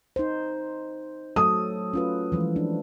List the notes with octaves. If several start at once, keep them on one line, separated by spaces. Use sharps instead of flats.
D#4 C5
F#3 A3 A4 D#6
C#4 F4 B4
E3 F3 G#3
D4